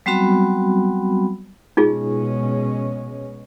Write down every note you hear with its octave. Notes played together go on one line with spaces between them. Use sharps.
F#3 G3 B3 C4 F#4 B5
B2 G#3 C#4 D#4 F4 G#4